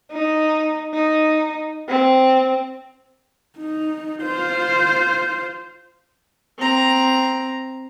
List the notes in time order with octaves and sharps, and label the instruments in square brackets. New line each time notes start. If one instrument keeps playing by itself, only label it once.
[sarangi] D#4
D#4
C4
[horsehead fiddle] D#4
F4 C5
[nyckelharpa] C4 A#5